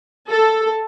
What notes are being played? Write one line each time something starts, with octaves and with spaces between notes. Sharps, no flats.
A4